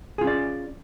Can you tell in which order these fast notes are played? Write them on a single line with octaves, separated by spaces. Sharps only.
G#4 F4 C#4 D5